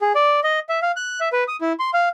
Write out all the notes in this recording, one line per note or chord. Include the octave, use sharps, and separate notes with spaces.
G#4
D5
D#5
E5
F5
F#6
E5
B4
D#6
E4
C6
F5